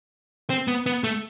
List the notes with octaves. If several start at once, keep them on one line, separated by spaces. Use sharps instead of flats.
C4
B3
B3
A3